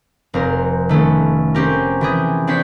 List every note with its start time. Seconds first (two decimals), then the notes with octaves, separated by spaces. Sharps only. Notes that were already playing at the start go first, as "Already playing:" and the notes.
0.34 F1 C4 A#4
0.89 D#3 A3 B3 C#4
1.55 C4 C#4 G4 A#4
2.01 E3 G4 G#4
2.47 C4 D4 C#5 G5 B6